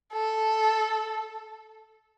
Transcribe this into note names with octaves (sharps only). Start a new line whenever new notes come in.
A4